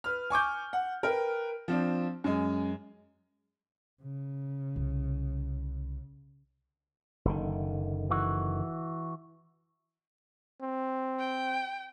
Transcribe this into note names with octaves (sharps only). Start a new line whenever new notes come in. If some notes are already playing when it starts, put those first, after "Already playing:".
B4 F6
G#5 C#6 D6 G6
F#5
A#4 B4 G5
F3 C4 D4
F#2 G#3
C#3
C2
F#1 D3 D#3
E3 F#4
C4
G5